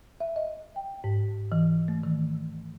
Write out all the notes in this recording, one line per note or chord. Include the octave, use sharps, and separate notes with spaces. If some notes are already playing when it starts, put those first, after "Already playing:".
E5
D#5
G5
G#2
E3
A3
D#3